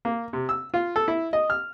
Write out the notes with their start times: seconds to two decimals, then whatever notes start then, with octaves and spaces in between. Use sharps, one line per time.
0.05 A#3
0.33 C3
0.49 E6
0.74 F4
0.96 A4
1.08 E4
1.33 D#5
1.50 F6